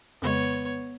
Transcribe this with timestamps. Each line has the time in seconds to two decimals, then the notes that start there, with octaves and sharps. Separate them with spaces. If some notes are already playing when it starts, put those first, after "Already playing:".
0.22 F2 C#3 G#3 B3 C#5